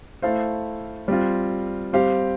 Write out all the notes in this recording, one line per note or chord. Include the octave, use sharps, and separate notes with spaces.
A3 E4 A4 C5 F5
G3 C4 F4
G3 C4 G4 C5 F5